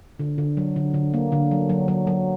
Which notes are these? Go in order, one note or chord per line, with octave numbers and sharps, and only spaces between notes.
D3
D3
F#3
D3
D3
A#3
D3
F#3
F#3
F#3
F#3